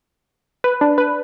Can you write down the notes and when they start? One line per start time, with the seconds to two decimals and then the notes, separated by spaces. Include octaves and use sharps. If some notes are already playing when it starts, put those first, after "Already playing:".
0.64 B4
0.81 D4
0.98 B4